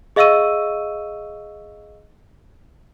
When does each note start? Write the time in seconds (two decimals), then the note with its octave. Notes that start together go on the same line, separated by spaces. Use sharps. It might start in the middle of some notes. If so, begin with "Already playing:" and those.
0.16 G#4 D#5 F5 C#6 E6 D#7